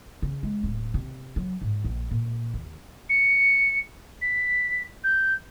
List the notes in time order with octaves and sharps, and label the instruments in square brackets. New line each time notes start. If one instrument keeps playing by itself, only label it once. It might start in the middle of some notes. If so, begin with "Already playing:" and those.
[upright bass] C#3
G#3
D1
C3
F#3
G#2
A#1
A#2
D#2
[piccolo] C#7
B6
G6